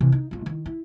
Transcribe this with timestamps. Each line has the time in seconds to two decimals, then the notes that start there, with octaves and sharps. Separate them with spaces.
0.01 C3 E3
0.12 D#4
0.31 G#1 F4
0.46 D#3 E4
0.66 E4